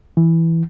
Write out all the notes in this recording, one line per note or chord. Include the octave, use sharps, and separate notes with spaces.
E3